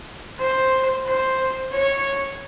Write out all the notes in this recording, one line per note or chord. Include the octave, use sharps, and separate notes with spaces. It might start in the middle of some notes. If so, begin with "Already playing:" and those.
C5
C5
C#5